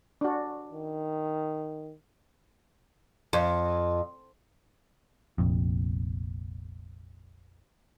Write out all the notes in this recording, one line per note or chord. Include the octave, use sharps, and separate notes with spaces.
D4 F#4
D#3
F2
F1 A#1 F2